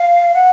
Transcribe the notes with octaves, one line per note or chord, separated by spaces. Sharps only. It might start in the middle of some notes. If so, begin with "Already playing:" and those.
Already playing: F5
F#5